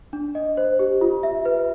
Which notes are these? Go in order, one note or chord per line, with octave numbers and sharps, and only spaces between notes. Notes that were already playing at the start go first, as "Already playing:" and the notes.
D4
D#5
C5
G4
F4
E5
B4